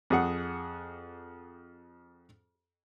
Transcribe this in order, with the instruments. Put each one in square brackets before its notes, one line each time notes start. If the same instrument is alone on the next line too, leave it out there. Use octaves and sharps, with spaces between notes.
[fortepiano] F2 G#4 F#5